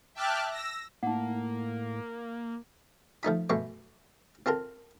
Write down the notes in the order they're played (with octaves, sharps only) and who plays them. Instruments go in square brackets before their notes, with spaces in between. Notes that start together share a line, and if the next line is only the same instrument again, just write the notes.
[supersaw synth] E5 G5 A5 D6 F6 F#6
E6 A#6
[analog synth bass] A2 [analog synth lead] A#3 [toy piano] D#4 F#5
[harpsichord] F3 A3 D#4 B5
F#2 B2 A3 C#6
C4 F4 A4 A#4